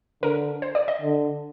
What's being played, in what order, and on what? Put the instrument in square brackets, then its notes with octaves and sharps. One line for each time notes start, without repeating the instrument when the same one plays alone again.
[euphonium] D3 [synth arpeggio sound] A#4
[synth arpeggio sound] C5
D5
D#5
[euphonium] D3